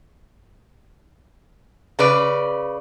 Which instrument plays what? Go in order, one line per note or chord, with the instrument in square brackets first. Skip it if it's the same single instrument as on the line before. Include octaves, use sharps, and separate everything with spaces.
[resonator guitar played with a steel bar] C#3 B4 D5